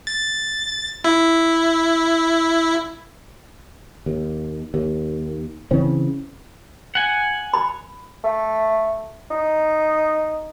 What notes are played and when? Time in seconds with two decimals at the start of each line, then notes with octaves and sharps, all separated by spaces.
0.07 A6
1.04 E4
4.06 D#2
4.74 D#2
5.71 C#3 E3 C4 C#4
6.95 F#5 G#5
7.54 B5
8.24 A3
9.31 D#4